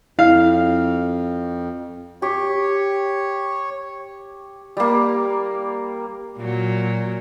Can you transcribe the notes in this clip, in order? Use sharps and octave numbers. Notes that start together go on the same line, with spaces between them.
F2 E4 F5
G4 C#5
G3 A#3
A#2 F#3